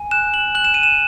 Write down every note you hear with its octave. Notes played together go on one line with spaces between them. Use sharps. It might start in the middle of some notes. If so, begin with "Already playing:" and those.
Already playing: G#5
F#6 E7
F#7
F#6 F#7
E7
D#7
E7